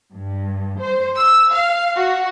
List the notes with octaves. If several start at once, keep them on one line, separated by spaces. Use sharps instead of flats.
G2
C5
E6
F5
F#4